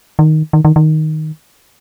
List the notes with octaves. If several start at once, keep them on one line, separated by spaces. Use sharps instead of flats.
D#3
D#3
D#3
D#3